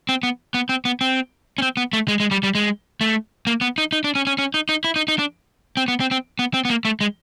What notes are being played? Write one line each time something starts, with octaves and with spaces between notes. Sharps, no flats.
C4
B3
B3
C4
B3
C4
C#4
C4
B3
A3
G#3
G#3
G3
G3
G#3
A3
A#3
B3
D#4
D#4
D4
C#4
C#4
C#4
D#4
D#4
E4
D#4
D#4
D4
C4
B3
C4
C4
B3
C4
B3
A#3
A3
G#3